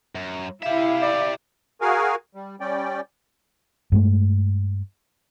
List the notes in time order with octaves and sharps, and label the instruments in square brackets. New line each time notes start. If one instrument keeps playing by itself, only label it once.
[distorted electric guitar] F#2
[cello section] E4 [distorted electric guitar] G4 E5 [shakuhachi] F5
[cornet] D5
[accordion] F#4 G#4 A#4 F5 G#5
G3
G3 C#4 D5 G5
[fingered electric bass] G2 G#3 A3